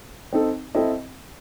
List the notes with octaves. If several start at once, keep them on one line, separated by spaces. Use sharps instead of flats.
C4 D#4 A4
C4 E4 A4 D#5